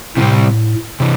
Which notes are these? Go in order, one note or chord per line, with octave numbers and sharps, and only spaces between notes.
A2 C3 E3 G3 C4
C3 E3